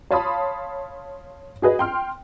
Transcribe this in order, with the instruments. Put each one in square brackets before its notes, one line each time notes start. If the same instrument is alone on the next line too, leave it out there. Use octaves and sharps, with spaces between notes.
[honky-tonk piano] C#5 F5 A5 B5 C6 D#6
F#4 G#4 B4 D#5
G5 C6 F6